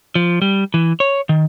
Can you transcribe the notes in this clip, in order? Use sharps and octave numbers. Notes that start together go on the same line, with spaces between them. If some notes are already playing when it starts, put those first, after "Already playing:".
F3
G3
E3
C#5
D#3